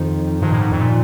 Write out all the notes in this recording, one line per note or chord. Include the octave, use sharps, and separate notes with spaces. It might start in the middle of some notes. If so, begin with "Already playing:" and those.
Already playing: F2 D#3 F3
G2 D#3 F3
A2
G#2
F2
A#2